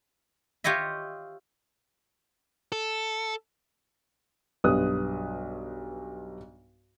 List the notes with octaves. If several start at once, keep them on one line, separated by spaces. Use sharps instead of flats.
F4 G4 C#5 D#5 E5
A4
B1 G2 B3 D#6 F#6